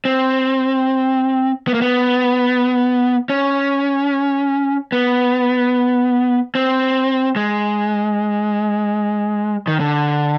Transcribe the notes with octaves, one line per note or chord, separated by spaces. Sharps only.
C4
B3
A#3
B3
C#4
B3
C4
G#3
D#3
D3